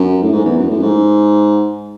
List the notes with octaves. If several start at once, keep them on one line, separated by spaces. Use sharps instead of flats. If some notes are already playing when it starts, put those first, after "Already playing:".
Already playing: F#2
A2
G#2
E2
F#2
A2
F#2
G#2